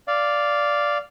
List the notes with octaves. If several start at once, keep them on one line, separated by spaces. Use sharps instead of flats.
D5 F5